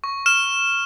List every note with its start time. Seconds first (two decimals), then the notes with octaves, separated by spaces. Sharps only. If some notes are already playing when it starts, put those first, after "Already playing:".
0.04 C#6
0.26 F6 E7